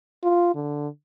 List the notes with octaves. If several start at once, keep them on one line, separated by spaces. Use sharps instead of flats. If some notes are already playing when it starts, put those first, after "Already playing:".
F4
D3